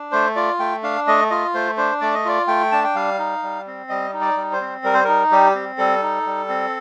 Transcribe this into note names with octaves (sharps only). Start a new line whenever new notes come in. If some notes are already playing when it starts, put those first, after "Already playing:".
Already playing: D4
A3 C5
F4 D5
A3 G5
D4 F5
A3 D#5
F4 D#5
A3 C5
D4 C5
A3 D5
D#5
F4 D5
A3 G5
D4 A5
G5
G3 F5
D#4
G3
C4
G3 D#5
D#4
D5
G3
C5
C4
G3 A#4
C5
D#4 A#4
G3 G4
C4
G3 A4
D#4
G3
C4